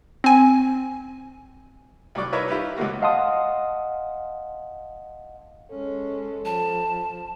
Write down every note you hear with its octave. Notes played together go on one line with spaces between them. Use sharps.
C4 G#5
C2 F#3 D5 D6
D#4 E4 A#4 B4 C#5 E5
E4 F4 G4 B4
C#2 G#2 C3 A#3 F#4
D#5 F5 F#5 A5 C6 D#6
G#3 C#4 A4
F3 A5